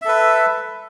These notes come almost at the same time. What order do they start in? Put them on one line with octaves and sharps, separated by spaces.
E5 A4 B4